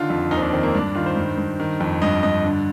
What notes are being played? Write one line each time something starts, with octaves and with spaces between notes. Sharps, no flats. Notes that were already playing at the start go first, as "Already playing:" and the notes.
Already playing: D3 D#3 F4
F2
D#2 D#4
C4
D4
D#3 C4
A#3
G2 D4
D#3 F4
C5
G2
G2
D#3
F2
G2 D#5
G2 D#5
D3